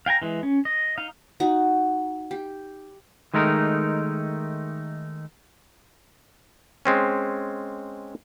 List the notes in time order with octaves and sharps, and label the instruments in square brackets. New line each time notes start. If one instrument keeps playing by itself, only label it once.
[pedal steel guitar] F5 G5 G#5 A#5
E3 G#3
C#4
D#5
D#4 F5
[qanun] D#4 F#4
G4
[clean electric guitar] D#3 G#3 A3 D#4 A#4
[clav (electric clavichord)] G#3 C4 C#4